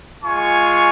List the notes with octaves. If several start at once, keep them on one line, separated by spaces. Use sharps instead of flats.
G#3 F4 G#5 C#6